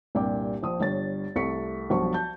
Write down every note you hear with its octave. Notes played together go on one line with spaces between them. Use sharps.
C2 G2 A#2 G5 D6
A#1 F3 C5 D#6
G1 G2 C#5 A6
C2 A3 C#6 B6 C#7
B1 G2 F3 C5 C#6
A5 G6